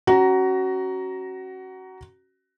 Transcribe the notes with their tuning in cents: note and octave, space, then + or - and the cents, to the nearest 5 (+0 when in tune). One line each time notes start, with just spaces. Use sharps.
C#4 -15 F#4 +20 A#5 +0